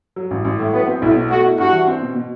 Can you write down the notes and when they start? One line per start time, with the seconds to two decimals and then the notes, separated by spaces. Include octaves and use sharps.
0.16 F#3
0.31 A1
0.45 A1
0.59 A2
0.73 F#3 B3
0.87 C4
1.01 B1 E4
1.16 B2
1.30 A3 F#4
1.44 E4
1.58 G2 F#4
1.72 E3
1.87 C4
2.01 B2
2.15 B2